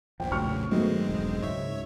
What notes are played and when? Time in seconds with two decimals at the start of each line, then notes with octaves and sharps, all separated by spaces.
0.20 A#1 E2 A#2 F3 G5
0.32 A2 C#3 F#3 C#6 F6
0.71 G1 D#3 F#3 G#3 A3 B3 C4
1.09 E1
1.42 C#2 G#2 C#5 E5